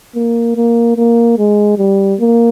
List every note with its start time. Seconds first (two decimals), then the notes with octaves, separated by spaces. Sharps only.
0.15 A#3
0.56 A#3
0.97 A#3
1.38 G#3
1.78 G3
2.20 A#3